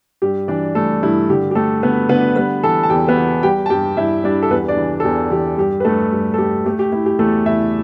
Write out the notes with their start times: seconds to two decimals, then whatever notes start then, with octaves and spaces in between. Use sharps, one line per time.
0.22 G2 G4
0.48 E3 D4 D5
0.75 G3 A3 A4
1.03 G2 E4
1.30 D3 G4
1.51 G4
1.55 A3 A4
1.83 D3 B3 B4
2.09 D3 B3 B4
2.36 G3 B3 B4
2.63 E3 A4 A5
2.83 A5
2.90 E2 G4 G5
3.08 B3 B4
3.17 E2
3.43 G3 G4 G5
3.66 A5
3.70 G2 G4 G5
3.97 G2 E4 E5
4.24 G3 D4 D5
4.43 A4
4.50 E2 B3 B4
4.68 D4 D5
4.77 E3
5.00 A4
5.04 E2 G4
5.31 E2 G4
5.58 G2 G4
5.80 B4
5.85 G2 A3 A4
6.12 G2
6.34 A4
6.38 A3 G4
6.66 A3 G4
6.79 G4
6.92 A3 E4
7.06 G4
7.19 E2 A3 A4
7.46 E2 E4 E5